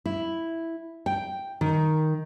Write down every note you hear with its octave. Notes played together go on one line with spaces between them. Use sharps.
E4
G5
D#3